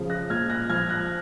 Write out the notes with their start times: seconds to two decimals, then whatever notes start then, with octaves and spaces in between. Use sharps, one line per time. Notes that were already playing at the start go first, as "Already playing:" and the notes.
Already playing: C#3 F3
0.10 F#6 A#6
0.30 A#2 F6 G#6
0.50 F#6 A#6
0.69 F3 F6 G#6
0.89 F#6 A#6